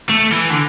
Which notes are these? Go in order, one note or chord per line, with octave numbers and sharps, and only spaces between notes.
A3
E3
D3